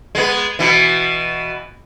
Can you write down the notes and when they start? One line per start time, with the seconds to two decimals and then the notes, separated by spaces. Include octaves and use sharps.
0.15 G#3 B3
0.59 B2 E3